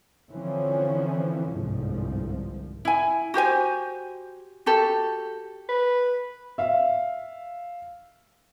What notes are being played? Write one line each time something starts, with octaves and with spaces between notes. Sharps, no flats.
D3 E3 F3 C4 C#4
G1 C2 G#2 F3
E4 G#5
F#4 G4 C5 G#5
F#4 G4 A4
B4
E5 F5